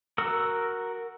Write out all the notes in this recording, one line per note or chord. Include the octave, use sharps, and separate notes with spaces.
F#4 A#4 E6